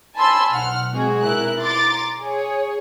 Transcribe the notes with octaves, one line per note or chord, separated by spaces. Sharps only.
G#5 A5 B5 C6 E6
B1 F#5 F6
G#3 C4 F#4 G#4
B2 E4 A#4 F#6
A#5 C6 D6 A6
G#4 C#5